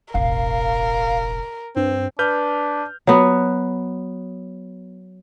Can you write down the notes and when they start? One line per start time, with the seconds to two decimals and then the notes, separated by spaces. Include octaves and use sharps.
0.14 E1 A1 A#4 F5
1.76 G2 C4
2.19 D4 B4 F6 G6
3.07 F#3 B3